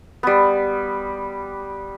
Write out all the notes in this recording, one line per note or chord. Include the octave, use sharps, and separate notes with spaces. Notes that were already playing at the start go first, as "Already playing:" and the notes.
G3 B3